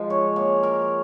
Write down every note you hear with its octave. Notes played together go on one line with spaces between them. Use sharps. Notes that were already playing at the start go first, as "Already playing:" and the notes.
Already playing: F3 G#3
C#5
A#3
A#4